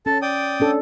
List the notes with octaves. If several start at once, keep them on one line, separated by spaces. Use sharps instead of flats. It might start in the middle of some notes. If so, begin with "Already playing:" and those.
C#4 A4 A5
D5 G5 D#6
C#4 D4 A4